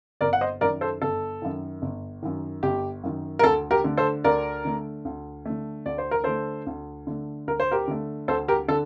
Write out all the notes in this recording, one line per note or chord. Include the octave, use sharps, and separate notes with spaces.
G1 A#4 D5
F#5
C5 D#5
F#2 D#3 A#4 D5
A4 C5
G1 A4
F#2 D#3
G1
F#2 D#3
G1 G4
F#2 D#3
A#4
D2 A4
G4 A#4
D3 A3
A4 C5
D2 A#4 D5
D3 A3
D2
D3 A3
D2 D5
C5
A#4
D3 A3 A4 C5
D2
D3 A3
D2 A#4
C5
G4 A#4
D3 A3
D2 A4 C5
G4 A#4
D3 A4